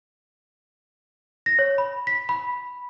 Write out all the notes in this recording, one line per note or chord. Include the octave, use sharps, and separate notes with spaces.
A#6
C#5
B5
B6
B5